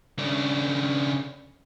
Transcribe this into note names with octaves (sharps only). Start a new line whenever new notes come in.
C#3 D4